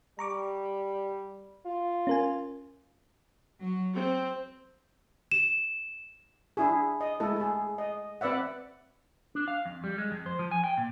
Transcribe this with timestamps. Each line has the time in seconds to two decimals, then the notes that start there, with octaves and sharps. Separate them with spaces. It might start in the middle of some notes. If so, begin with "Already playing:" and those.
0.19 G3 A#5 C#6 D6
1.66 F4
2.07 C#4 A#4 G#5
3.60 F#3
3.94 C4
5.32 E7
6.57 D4 E4 G#4
7.01 D#5
7.20 G#3 A3 E4 A4
7.36 G#4 A4
7.78 D#5
8.21 C4 B4 D5 E5 F#5
9.35 D4
9.48 F5
9.66 F2
9.84 G3
9.98 G#3
10.11 F2
10.26 C5
10.39 F3
10.51 G#5
10.64 G5
10.78 A#2